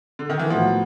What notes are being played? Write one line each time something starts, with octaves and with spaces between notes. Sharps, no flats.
D3
D#3
E3
A2 F3 F#3 B3